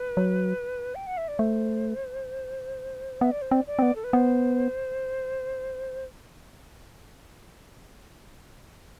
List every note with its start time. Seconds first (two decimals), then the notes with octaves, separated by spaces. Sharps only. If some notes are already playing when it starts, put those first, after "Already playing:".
Already playing: B4
0.17 F#3
0.95 G5
1.07 F#5
1.17 E5
1.28 D5
1.39 A3 C5
3.21 B3 E5
3.31 D5
3.42 C5
3.51 C4 D5
3.67 D5
3.79 C4
3.82 B3
3.96 A4
4.04 B4
4.13 B3 C5